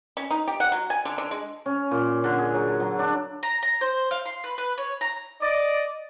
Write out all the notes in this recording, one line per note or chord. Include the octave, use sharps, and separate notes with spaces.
C#4
D#4
G4
F#5
F#3
G#5
D3
D3
G#3
C#4
A#2
D3
G#4
F#3
A4
F#3
D4
A#5
A#5
C5
F5
C6
B4
B4
C#5
A#5
D5 D#5